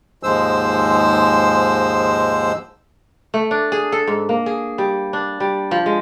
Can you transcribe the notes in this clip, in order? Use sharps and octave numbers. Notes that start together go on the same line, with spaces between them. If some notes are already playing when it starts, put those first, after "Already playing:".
D#2 G#2 F3 G#3 C5 E6
A3
D4
G#4
A4
G#2
A#3
G#4
G3
D4
G3
F3
G#3